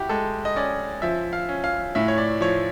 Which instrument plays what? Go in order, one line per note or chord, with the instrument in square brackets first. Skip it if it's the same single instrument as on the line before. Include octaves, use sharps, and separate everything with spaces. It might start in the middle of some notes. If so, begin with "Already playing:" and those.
Already playing: [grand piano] E4 F#4 G4
G#3 A4
D#5
C#4 D5
F3 E5
F5
C#4
F5
A2 E5
C#5
D5
F3 C#5